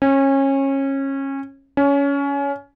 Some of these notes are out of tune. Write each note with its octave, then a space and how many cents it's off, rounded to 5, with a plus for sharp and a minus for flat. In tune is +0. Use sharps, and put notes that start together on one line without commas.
C#4 -25
C#4 +20